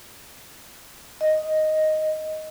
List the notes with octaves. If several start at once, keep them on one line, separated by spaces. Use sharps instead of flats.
D#5